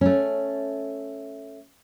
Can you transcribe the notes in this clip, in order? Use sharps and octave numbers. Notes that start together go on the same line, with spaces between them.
A3 C#4